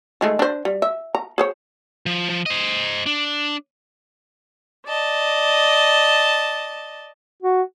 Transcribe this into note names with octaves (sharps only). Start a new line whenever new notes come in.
D#3 G#3 A3
D4 C5
G3
E5
A#5
G#4 C5 C#5
F3
F3
C5 D#5
D4
D5 D#5 A5
F#4